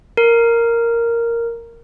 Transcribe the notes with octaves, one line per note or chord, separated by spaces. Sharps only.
A#4